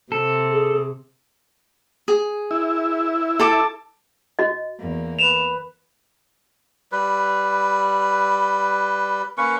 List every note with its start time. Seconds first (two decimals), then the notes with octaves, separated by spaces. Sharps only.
0.12 C3 A4
0.51 G#4
2.08 G#4
2.51 E4
3.39 A4 A5 D6
4.39 F#4 D#5
4.79 E2 A#3
5.19 B4 E7 F7
6.92 G3 B4
9.38 A#3 C#4 B4 C#6